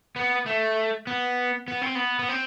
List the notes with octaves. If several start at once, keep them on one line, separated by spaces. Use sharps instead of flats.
B3
A3
B3
B3
C4
B3
B3
C4